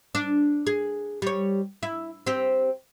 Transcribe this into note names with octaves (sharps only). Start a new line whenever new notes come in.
D4
G#4
G3 C#5
E4
C4 G4